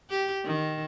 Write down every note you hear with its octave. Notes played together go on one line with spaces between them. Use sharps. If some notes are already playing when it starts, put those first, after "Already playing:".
G4
D#3